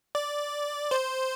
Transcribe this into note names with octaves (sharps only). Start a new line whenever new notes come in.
D5
C5